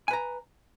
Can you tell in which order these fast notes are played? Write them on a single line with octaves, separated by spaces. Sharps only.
G#5 B4 A#5